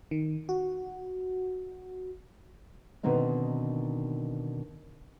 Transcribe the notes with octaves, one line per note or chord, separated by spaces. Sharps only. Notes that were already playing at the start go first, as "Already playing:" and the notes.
D#3
F#4
B2 D3 D#3 A#3 C4 D#4